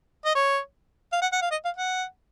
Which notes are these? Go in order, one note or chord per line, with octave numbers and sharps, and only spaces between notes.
D#5
C#5
F5
F#5
F#5
F5
D#5
F5
F#5